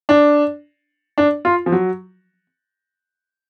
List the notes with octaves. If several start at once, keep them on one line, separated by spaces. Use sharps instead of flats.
D4
D4
F4
F3
F#3